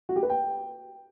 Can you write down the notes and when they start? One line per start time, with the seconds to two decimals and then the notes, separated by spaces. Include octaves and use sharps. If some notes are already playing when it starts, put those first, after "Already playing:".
0.09 F#4
0.16 G4
0.23 B4
0.30 G5